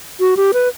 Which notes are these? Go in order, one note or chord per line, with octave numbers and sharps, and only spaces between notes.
F#4
G4
B4